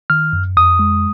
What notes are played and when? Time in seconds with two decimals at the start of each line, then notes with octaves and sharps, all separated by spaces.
0.10 D#3 F6
0.33 F#2
0.57 F2 D#6
0.79 G#3